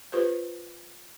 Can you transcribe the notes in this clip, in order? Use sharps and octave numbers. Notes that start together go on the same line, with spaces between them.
F4 G4 B4 C5